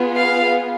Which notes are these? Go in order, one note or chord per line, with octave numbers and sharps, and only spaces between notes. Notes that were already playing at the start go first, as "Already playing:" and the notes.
Already playing: B3 F4 G#4
F5